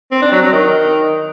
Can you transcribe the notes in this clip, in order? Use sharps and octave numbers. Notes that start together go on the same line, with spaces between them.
C4
D4
F#3
F#3
D#3